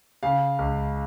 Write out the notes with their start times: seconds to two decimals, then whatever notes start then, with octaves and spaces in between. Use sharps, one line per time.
0.23 C#3 F5
0.59 C#2